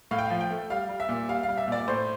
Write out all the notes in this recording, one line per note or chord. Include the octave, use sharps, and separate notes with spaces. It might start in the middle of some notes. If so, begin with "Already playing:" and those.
A2 F5
G5
F3 F5
G5
A3
G3 F5
G3
E5
A#2
G3 F5
F5
G3
E5
A#2 D5
A2 C5